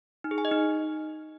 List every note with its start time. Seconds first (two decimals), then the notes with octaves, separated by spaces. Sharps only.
0.24 D#4
0.31 G#4
0.38 G#5
0.45 D#5
0.51 D#4